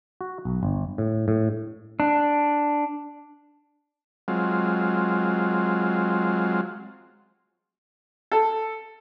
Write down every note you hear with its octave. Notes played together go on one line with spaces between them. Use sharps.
F#4
B1
G1
A2
A2
D4
F#3 G#3 C4 F4
A4